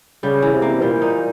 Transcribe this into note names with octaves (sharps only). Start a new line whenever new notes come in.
C#3 G3
E3
C3
A#3
A#2 G3
D#4